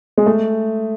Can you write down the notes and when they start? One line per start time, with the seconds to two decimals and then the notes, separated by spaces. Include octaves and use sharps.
0.17 G#3
0.26 A3